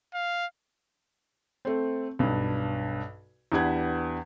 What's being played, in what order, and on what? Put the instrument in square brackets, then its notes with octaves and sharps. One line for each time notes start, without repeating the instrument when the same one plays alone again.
[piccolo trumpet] F5
[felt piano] A3 C4
B1 G2
E2 D4 G4 B4 F#5 G#6